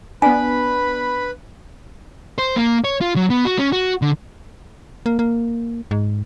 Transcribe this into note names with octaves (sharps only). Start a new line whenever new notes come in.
B3 D4 B4 G#5 B5
C5
A#3
C#5
F4
F#3
B3
F#4
C#4
F#4
D3
A#3
A#3
G#2